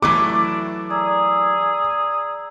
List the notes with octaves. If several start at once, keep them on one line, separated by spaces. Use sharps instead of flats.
E3 F#3 A3 D4 D6
G#4 D5 A#5 E6